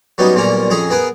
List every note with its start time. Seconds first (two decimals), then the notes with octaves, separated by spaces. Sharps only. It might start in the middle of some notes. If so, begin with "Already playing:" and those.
0.18 F#3 G3 B3 C#4 D#4
0.34 B1 A#2 G3 A#3 C#4 A#5
0.70 F2 C#4 G#4 A#5
0.90 B3 G#4 A#4 B4